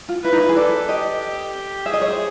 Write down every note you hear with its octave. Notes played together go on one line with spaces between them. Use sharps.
F4
E4 B4
D#4
E4
G#4
A4 D5
G4 D#5
G#4 E5
D#5
C#5
C5